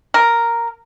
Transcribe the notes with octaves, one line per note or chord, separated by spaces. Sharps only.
A#4